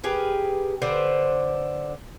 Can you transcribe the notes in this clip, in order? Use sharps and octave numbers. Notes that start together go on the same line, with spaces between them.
G4 G#4 A#4 B4
D3 D4 B4 C5